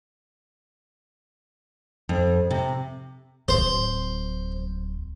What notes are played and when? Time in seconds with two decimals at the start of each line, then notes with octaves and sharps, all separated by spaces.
2.09 F2
2.51 C3
3.48 D1 F#3 C5